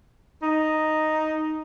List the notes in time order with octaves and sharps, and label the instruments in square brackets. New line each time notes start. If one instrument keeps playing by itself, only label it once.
[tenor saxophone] D#4